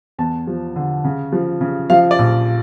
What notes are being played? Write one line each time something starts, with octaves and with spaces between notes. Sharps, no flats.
E2 A5
F3
D3
C#3
F3
C#3
F3 F5
D5
A#1